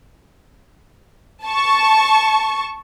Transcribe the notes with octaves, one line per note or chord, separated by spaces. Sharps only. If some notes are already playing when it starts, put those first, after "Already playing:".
A5 C#6